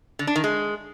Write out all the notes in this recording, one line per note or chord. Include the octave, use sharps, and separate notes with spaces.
D3
D4
D#3
G#3